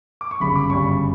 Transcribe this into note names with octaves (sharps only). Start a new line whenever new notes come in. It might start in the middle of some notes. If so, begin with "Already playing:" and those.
D6
C#6
G1 F#2 C#3 G3 B5
D6
G1 F#2 C#3 G3 C#6